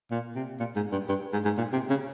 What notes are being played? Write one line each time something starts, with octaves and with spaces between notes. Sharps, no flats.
A#2
C3
A#2
G#2
G2
G2
G#2
G#2
A#2
C3
C#3